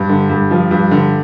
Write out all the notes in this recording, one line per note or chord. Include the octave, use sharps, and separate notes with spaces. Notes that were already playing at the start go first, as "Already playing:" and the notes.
Already playing: G2
D3
G2
F3
G2
D3